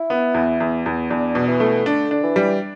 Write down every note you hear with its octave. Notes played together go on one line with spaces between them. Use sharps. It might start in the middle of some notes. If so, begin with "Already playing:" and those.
Already playing: E4
B3
E2
E2
E2
E2 D4
B2
E3
A3
D3 D4
D4
E3
G3